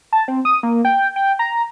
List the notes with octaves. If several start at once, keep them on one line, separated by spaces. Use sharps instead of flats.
A5
C4
D#6
A#3
G5
G5
A#5